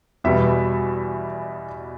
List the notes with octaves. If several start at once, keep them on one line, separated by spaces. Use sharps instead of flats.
E2 B2 G3 B3 E5